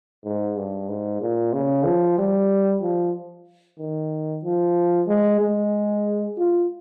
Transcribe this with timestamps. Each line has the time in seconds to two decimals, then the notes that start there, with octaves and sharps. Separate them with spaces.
0.24 G#2
0.57 G2
0.88 G#2
1.21 A#2
1.53 C#3
1.85 F3
2.18 G3
2.82 F3
3.79 D#3
4.44 F3
5.08 G#3
5.40 G#3
6.37 F4